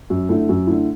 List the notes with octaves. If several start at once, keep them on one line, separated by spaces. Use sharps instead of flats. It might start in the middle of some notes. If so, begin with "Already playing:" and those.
F#2
D3 A3 E4
F#2
D3 A3 E4